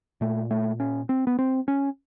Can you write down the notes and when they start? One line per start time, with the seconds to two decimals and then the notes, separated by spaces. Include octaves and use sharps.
0.21 A#2 A3
0.51 A3
0.80 C#4
1.09 C4
1.27 B3
1.39 C4
1.68 C#4